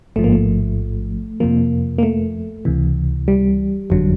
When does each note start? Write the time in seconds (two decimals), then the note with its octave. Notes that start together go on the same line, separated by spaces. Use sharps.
0.16 A1 G#2 F3 A3
0.24 A#3
0.33 A3
1.40 F2 C3 F3 A#3
1.98 A#3
2.03 A3
2.65 C#2 C3 E3
3.28 G3
3.90 G1 F2 D3 F#3